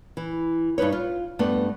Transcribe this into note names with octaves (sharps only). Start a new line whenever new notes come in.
E3
G2 D#4 B4 C#5
F4
G2 A3 B3 D4